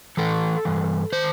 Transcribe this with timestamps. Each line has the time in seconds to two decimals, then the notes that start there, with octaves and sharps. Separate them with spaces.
0.17 A2 E3 A4
0.65 G2 E3
1.12 D#3 C5